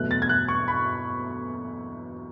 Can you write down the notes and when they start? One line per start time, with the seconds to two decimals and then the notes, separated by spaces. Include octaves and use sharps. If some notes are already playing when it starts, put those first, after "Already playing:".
Already playing: E2 B2 F#3 A3 F#6
0.11 A6
0.22 G#6
0.29 F#6
0.48 C#6
0.68 B5